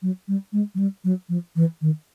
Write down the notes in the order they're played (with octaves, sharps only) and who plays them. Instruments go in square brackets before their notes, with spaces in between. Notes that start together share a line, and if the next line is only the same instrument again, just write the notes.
[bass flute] F#3
G3
G#3
F#3
G3
F#3
F3
E3
D#3